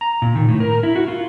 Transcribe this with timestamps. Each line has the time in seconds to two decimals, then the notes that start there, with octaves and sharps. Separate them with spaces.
0.01 A#5
0.22 A#2
0.36 D#3
0.49 A2
0.60 A#4
0.83 E4
0.96 F#4
1.08 F4